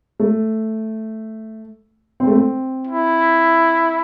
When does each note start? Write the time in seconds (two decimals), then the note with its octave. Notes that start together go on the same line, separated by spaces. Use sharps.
0.20 A3
2.20 C4
2.27 A3
2.35 C4
2.87 E4